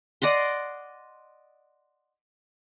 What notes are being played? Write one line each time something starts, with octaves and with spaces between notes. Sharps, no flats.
D5 D#5 F#5 C6